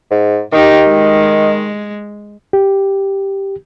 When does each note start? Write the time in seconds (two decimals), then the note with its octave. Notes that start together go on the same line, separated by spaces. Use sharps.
0.11 G#2
0.53 D#3 D#4 G4
0.87 G#3
2.53 G4